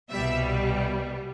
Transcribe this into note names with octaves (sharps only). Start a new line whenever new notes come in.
C2 B2 G3 E5